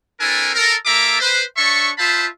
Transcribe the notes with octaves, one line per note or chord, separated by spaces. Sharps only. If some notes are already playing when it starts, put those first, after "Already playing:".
C4 D4 E4 A4 A#4 G#5
A4 A#4
A#3 F4 A4 E5 A#5 D6
B4 C5
D4 A4 C#5 E5 C#6
F4 C5 E5 F5 A5 B5